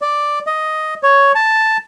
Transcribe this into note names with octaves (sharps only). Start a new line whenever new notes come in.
D5
D#5
C#5
A5